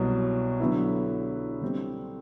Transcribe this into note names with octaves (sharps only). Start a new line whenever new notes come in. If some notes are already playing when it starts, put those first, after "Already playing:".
Already playing: C2 B2 F#3
D3 F#3 B3 E4
D3 G3 C4